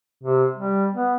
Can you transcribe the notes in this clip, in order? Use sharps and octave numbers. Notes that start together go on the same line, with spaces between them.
C3
G3
B3